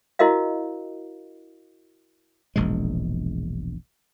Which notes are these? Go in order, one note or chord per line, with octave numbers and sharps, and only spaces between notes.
E4 F#4 A#4 D#5 F5
E1 A#1 G#2 G#3